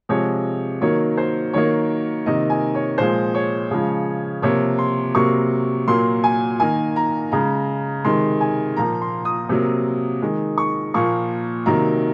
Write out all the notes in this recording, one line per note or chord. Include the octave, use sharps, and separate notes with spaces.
C3 F3 G#3 C#5
D#3 F#3 A#3 C#5
C5
D#3 F#3 A#3 C#5
C3 D#3 A#3 D#5
G#5
C#5
A#2 F3 G#3 C5
C#5
C#3 F3 G#3
C3 F3 A#3 C#5
C6
C3 F#3 A#3 C#6
A#2 F#3 A#3 C6
G#5
D#3 A#3 G#5
A#5
C#3 G#3 A#5
C3 D#3 G#3 C6
G#5
A#2 F3 A#3 A#5
C6
D#6
C3 F#3 A#3
D#3 G#3
C#6
A#2 F3 A#3 C#6
C3 D#3 F#3 A#3 A#5